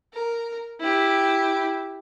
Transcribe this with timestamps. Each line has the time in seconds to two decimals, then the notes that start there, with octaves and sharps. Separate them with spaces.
0.13 A#4
0.80 E4 G4